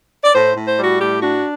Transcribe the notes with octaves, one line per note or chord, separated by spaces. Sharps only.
D5
A2 C5
A2
C5
G3
F#4
A2 G4
D4 F#4